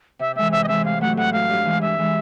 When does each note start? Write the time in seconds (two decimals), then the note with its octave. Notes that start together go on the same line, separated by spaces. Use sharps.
0.19 C3 E5
0.36 E3 G#3 C4 E5
0.52 C3 E5
0.64 D#5
0.68 E3 G#3 C4 E5
0.85 A2 F5
1.01 F#3 A3 F#5
1.17 A2 F#5
1.33 F#3 A3 F5
1.49 G2
1.65 E3 G#3
1.81 G2 E5
1.98 E3 G#3